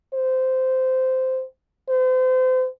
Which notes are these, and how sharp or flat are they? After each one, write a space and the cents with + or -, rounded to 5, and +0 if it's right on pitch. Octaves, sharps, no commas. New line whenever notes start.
C5 -10
C5 -35